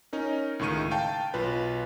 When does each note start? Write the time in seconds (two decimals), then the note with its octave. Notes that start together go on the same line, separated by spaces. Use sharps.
0.13 C#4 D#4 A#4
0.59 C#2 A2 D#3 C#6 D#7
0.91 F5 G5 A5
1.34 B1 F4 B4